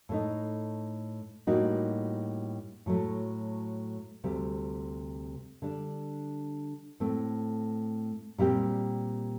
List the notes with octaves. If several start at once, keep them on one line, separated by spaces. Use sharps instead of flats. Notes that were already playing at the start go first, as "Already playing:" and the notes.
A2 A3 D#4
A2 G3 A#3 D#4 F#4
A2 F#3 A3
D2 C3 G3
D3 G3 D4
A2 A3 C4
A#2 G3 C4 G4